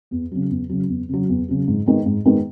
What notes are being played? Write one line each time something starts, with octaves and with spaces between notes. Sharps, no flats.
E2
C#3 F#3
E2
C#3 F#3
E2
C#3 F#3
E2
C#3 F#3
G#2
D#3 G#3 B3
G#2
D#3 G#3 B3